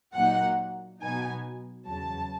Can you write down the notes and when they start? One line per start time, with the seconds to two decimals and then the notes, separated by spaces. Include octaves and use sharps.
0.14 A#2 F#3 A#3 D#4 F#5
1.00 B2 F#3 B3 D#4 G#5
1.86 E2 C#3 F#3 A5